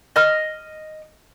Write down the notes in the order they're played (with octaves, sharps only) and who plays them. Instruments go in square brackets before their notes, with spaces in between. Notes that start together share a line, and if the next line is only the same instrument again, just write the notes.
[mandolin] D#5 F6